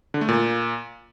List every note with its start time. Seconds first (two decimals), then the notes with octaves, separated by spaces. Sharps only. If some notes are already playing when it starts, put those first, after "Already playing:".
0.14 D3
0.21 A3
0.29 A#2